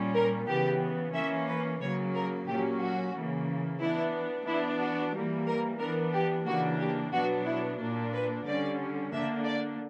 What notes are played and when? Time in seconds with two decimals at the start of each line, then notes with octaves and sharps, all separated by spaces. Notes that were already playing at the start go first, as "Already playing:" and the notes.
Already playing: A#2 G3 C#4
0.15 A#4
0.47 C#3 E3 B3 G4
1.14 E3 A#3 C#4 E5
1.48 B4
1.81 C#3 F#3 A#3 C#5
2.14 A#4
2.47 A#2 F#3 A#3 C#4 G4
2.81 F#4
3.14 C#3 E3 A#3
3.80 E3 B3 D4 E4
4.47 E3 B3 D4 E4
4.80 F#4
5.14 E3 G3 A#3
5.47 A#4
5.80 E3 B3 D4 A#4
6.13 G4
6.46 C#3 E3 A#3 D4 F#4
6.79 G4
7.13 B2 F#3 B3 D4 F#4
7.46 E4
7.79 A#2 A#3 D4
8.13 B4
8.46 D3 G3 C#4 D5
9.12 D3 A#3 D4 E5
9.46 D5